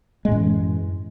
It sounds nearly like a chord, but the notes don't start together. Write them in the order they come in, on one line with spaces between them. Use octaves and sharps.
G#3 A2 F#2 E3